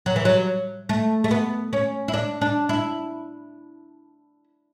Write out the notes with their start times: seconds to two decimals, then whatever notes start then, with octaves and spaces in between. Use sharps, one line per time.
0.06 F#3
0.16 E3
0.25 F#3
0.89 A3
1.24 A3
1.31 B3
1.73 C#4
2.08 E4
2.14 D4
2.41 D4
2.69 E4